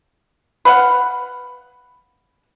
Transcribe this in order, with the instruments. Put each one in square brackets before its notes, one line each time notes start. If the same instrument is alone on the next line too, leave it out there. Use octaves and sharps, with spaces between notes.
[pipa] B4 F5 F#5